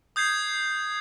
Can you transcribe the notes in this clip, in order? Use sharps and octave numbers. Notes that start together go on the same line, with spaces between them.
D#6 G6 G#6 C7